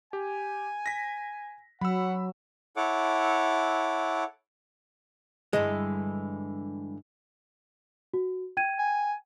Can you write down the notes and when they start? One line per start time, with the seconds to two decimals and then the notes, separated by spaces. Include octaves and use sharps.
0.13 G4 G#5
0.86 A#6 B6
1.81 F#3 F#5 B5 E6
2.76 E4 A4 C#5 F#5 D6
5.53 G2 D3 E3 G#3
8.14 F#4
8.57 G5 G#6 D#7
8.79 G#5